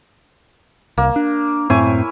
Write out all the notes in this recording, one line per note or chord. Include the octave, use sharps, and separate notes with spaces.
C2 A#3
D4
F#2 A2 C4 E4 C#5 G#5